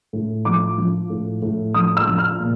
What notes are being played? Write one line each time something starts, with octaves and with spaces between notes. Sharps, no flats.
A2
F3 D6
F3
A2
A2
F3 D#6
E6
F3
F6
A#2